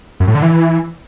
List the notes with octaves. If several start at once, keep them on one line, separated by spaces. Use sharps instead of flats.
F#2
A2
D3
E3